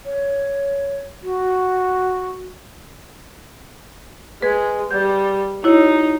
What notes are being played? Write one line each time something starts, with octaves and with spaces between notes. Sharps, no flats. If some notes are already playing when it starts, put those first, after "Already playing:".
C#5
F#4
G#3 B4 G#6
G3 G6
D#4 E4 F#4 C#5